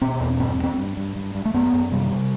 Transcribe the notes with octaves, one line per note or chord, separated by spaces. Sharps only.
B2 C4
E2
G2 C4
G2
C4
G2
G2
G2
G2
A3
F#2 B3
F#2
C3 G3
C3